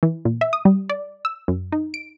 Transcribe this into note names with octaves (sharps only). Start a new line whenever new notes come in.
E3
A#2
E5
D#6
G3
D5
E6
F#2
D#4
D7